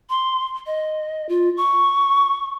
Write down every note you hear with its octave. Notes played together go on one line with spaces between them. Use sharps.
C6
D#5
F4
C#6